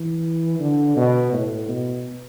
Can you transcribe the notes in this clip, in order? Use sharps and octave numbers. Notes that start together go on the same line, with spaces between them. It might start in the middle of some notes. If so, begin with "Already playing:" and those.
Already playing: E3
D3
B2
A2
B2